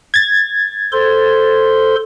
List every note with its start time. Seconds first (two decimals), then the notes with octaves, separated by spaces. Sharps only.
0.14 G#6 A6
0.92 A4 C5 C6